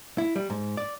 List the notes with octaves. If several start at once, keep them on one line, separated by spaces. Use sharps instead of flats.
E4
G3
G#2
D5